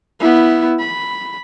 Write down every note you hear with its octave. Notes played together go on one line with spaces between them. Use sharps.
B3 E4
B5